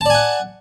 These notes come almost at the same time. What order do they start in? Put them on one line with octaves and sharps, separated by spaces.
A5 D5 G#5 F#5